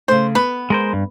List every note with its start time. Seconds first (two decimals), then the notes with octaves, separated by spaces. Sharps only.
0.08 C#3 A3 C5
0.35 B3 B4
0.70 G#3 A#4 C5
0.93 G2